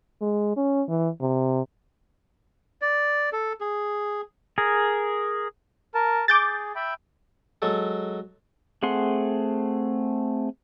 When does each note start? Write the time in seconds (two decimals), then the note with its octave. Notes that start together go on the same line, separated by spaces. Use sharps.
0.22 G#3
0.57 C#4
0.88 E3
1.21 C3
2.82 D5
3.33 A4
3.61 G#4
4.58 G#4 A#4
5.94 A#4 A5
6.28 G#4 D6 G6 A6
6.75 E5 G5 B5
7.62 F#3 G#3 A4
8.83 A3 C4 G#4 F#5 C6